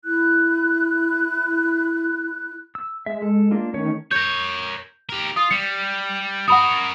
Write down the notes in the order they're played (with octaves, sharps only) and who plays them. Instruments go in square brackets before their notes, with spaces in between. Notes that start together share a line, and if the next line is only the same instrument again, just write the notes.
[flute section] E4 F#6
[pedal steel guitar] E6
[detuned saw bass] G#3 [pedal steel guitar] E5
[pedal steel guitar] A4
A#3 D4 F4
[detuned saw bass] D#3 [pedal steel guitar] A3 C#4 C#5
[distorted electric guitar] A#4 C#5 [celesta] G6
[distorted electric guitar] G4 A#4
[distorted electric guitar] F4 [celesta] D#6
[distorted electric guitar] G3 [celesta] C#7
[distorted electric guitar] F#4 A#4 [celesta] F#5 B5 D#6